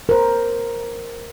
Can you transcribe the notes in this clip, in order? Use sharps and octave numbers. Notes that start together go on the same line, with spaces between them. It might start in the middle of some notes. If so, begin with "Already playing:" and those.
A#4 C5